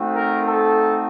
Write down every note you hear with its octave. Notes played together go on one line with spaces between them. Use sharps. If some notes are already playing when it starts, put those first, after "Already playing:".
Already playing: A3 C4 D#4 F#4
A#4
A4